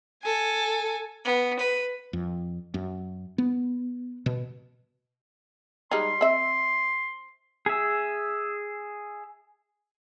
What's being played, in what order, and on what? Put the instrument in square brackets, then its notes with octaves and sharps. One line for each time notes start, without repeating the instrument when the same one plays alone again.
[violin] A4 G#5
[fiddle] B3
B4
[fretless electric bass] F2
F#2
B3
B2
[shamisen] G3 G#3 D#4 [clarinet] C6
[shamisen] C4 E5
[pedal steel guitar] G#4 E5